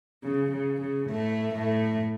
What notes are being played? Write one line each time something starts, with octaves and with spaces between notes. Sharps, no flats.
C#3
C#3
C#3
A2 A3
A2 A3